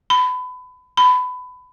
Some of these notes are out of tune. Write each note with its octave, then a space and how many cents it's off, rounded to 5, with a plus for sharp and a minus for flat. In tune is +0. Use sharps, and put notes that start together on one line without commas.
B5 +25
B5 +20